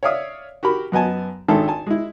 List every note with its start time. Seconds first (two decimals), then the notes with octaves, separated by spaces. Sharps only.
0.03 C#5 D5 E5 F5 D#6
0.63 F#4 G4 A#4 B5
0.92 F#2 B3 D#5 G#5 A5
1.48 G#1 G#2 D4 D#4 A4 E5
1.68 G#5 A5
1.87 G#3 E4